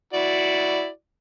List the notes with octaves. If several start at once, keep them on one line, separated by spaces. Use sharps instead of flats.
E4 F#4 D5